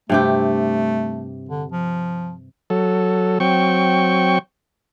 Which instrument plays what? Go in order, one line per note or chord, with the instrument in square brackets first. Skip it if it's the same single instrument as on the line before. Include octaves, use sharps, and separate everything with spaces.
[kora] G2 C3 G4 [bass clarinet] A3
[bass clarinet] D3
F3
[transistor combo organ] F#3 A4
F#3 C4 G5 C#6